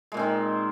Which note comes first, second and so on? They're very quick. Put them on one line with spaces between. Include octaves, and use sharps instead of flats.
G#3 A#2 C4 D#3